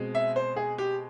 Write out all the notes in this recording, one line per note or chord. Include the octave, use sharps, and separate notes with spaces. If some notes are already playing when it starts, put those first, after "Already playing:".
Already playing: B2 G#3 C4
E5
C5
G#4
G4